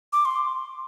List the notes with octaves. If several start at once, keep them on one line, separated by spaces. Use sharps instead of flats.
D6
C6